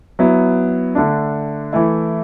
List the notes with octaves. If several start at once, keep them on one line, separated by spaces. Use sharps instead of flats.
F#3 B3 E4
D3 A3 D4
E3 A3 E4